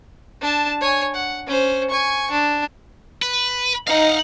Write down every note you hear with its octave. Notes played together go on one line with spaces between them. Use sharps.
D4 A5
C#5 G#5
F#5
C#4 C5
G#5 C#6
D4
B4
D#4 F5 F#5